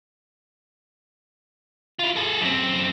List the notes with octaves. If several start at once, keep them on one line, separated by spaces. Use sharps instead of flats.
E4 F4
G#4 A4
F#2 C4